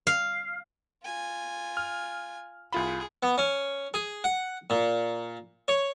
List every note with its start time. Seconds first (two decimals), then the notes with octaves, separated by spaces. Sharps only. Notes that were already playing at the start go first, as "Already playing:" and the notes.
0.07 F5
1.04 F4 G#5
1.77 F6
2.73 C2 F4 G#4 B5
3.23 B3
3.38 C#4
3.94 G#4
4.24 F#5
4.70 A#2
5.68 C#5